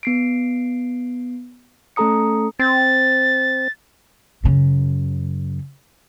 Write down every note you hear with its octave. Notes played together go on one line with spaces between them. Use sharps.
B3 C7 D7
A3 C#4 A4 A#5 D#6 C#7
C4 A6
F#2 C#3